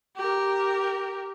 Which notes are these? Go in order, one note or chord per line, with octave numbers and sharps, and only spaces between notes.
G4 A#4